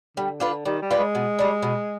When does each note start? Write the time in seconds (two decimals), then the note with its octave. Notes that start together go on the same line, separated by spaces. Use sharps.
0.17 D3 G3
0.40 D3 D4 F4 B4
0.65 D#3 G3
0.82 G3
0.91 D4 F4 B4
0.98 G#3
1.15 B2
1.39 G3 D4
1.63 B2